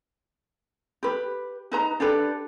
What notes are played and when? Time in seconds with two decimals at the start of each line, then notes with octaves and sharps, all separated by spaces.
1.03 G4 B4
1.72 D#4 B4 A#5
2.00 D4 G4 A4 B4